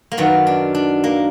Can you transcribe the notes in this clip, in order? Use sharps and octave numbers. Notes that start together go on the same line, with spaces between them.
A#3
F#2 D#3 F#3 B3
D4
D4
A#3